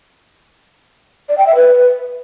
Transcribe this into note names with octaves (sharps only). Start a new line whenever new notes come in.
D5
G5
E5
B4